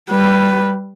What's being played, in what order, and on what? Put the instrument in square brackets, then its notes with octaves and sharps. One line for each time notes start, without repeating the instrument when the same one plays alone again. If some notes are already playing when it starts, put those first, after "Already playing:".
[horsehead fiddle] G3 B4